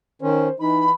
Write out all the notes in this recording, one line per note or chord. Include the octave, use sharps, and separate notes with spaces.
D#3 C#4 C5
E3 D#4 B5